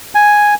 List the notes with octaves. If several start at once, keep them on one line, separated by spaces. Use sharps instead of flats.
G#5